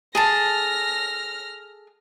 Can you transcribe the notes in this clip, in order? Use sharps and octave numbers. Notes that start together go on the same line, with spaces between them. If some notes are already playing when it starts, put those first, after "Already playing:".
G#4 A4 A5 F6 A#6